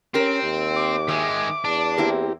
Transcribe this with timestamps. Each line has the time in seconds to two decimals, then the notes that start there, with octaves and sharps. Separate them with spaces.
0.14 C4 C#4 G4 A#4
0.43 D#2
0.76 D6
1.09 D#3 G#3 E5
1.65 E2 D4
1.98 A#3 C4 E4 G4